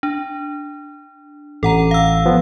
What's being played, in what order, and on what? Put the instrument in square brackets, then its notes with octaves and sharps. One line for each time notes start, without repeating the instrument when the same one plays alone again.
[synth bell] D4
[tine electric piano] A1 [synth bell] A4 F#5 A#5
[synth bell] F5 E6
[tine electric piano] F3 B3